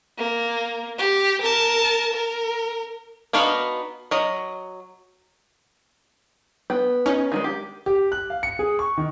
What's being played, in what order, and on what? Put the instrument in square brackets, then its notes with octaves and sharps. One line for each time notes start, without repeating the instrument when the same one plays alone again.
[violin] A#3
G4
A#4 A5
A#4
[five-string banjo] B3 D4 D#4 F#4 F5
F#3 D#5
B3 G5
[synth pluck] C#4 D#4
[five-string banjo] D#3 G3 G#3
G4
[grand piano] G4
F#6
F5
C#7
G#4
C#6
D#3